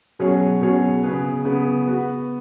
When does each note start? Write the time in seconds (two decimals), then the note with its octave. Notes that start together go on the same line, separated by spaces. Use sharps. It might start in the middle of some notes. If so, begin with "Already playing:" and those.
0.19 B2 F#3 C#4 G#4 C#5
0.61 B2 F#3 C#4 G#4 C#5
1.03 C#3 B3 G#4 B4
1.45 C#3 B3 G#4 B4
1.87 B3 F#4 B4